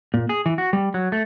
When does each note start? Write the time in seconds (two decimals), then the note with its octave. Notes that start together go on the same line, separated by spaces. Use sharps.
0.14 A#2
0.29 G#4
0.46 E3
0.58 F#4
0.73 G3
0.94 F#3
1.12 A3